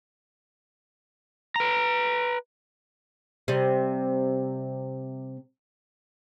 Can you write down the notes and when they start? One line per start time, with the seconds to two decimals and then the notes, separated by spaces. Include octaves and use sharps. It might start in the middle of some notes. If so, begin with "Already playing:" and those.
1.56 B4 A#5
3.48 C3 G3